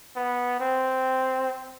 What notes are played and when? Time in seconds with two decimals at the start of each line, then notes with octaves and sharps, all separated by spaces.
0.16 B3
0.60 C4